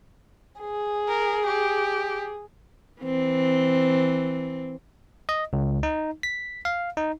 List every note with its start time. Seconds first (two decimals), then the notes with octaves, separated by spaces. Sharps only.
0.60 G#4
1.09 A#4
1.46 G4
3.02 E3 C4
5.29 D#5
5.53 C#2
5.83 D#4
6.23 B6
6.65 F5
6.97 D#4